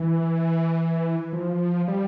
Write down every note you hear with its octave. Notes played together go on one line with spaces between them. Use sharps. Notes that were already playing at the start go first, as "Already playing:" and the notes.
Already playing: E3
F3
G3